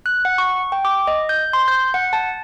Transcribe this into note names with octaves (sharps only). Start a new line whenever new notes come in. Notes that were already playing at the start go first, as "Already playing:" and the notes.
F#6
F#5
C#6
G5
D6
D#5
G6
C6
G6
F#5
A5